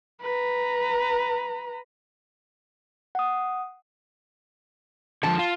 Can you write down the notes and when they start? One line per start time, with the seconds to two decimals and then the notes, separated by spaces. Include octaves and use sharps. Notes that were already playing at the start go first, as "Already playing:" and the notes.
0.22 B4 A#5
3.15 F#5 D#6
5.23 D3 D#3 F3 A5
5.39 F4